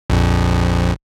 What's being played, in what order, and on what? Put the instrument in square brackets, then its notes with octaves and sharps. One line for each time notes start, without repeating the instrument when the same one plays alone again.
[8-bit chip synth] A#1 F2